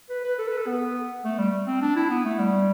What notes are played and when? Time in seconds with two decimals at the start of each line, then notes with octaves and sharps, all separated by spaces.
0.10 B4
0.24 B4
0.39 A4
0.48 B4
0.57 A4
0.67 B3
1.25 A3
1.38 G3
1.67 C4
1.82 D4
1.96 E4
2.10 B3
2.25 A3
2.38 G3